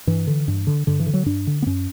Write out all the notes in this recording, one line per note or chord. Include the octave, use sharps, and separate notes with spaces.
G2 E3
D3
G2
D3
G2 D3
E3
D3
F#3
G2 D4
D3
B3
F#2 C#4